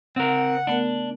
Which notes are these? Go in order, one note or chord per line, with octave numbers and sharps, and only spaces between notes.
C#3 C4 A#4 F#5
A3 B3 D4 A#4